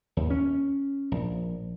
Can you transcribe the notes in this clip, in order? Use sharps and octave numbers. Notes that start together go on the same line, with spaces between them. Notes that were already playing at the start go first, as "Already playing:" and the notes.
D#2
C#4
A#1